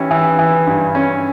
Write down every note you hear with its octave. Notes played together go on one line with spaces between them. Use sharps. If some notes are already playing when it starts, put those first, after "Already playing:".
Already playing: E3 C#4 G4
E3
E3
G2
C#4